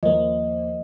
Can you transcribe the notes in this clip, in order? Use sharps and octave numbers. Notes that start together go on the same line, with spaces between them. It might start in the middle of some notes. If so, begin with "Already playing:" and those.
D#2 F3 A#3 D#5